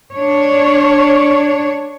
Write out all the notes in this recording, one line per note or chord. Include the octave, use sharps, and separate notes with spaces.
D4 C#5